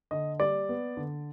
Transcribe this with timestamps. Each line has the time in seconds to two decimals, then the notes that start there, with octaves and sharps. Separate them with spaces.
0.11 D3 D#5
0.40 G3 D5
0.69 B3
0.97 D3